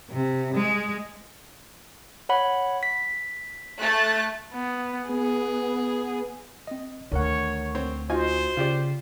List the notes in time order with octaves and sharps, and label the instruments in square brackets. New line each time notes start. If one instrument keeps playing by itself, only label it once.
[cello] C3
G#3
[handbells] C#5 F#5 B5
B6
[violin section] A3 F#6 A6
[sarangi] B3
[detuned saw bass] B3 [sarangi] G#4
[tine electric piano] C4 D#5
[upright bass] D2 [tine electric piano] D#3 A#4 F#5 [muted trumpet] C#5
[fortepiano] C4 C#5
[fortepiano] D#4 F4 G#5 [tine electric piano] F#4 D#5 [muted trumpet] C5
[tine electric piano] C#3 [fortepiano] F4 G4 D5